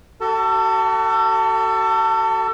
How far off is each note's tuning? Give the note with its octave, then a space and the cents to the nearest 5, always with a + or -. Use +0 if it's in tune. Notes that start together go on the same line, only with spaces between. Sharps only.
F#4 +40 A4 +30 A5 +0